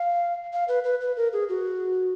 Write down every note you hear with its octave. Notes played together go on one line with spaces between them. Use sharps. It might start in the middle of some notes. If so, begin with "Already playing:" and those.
Already playing: F5
F5
B4
B4
B4
A#4
G#4
F#4